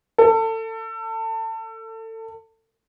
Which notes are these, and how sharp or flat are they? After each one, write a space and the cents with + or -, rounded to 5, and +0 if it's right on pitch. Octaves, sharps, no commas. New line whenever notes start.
A4 +25